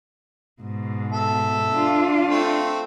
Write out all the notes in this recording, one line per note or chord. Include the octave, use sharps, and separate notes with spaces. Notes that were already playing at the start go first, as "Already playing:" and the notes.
G#2 B2
A4 E5
D4 F4
A3 C4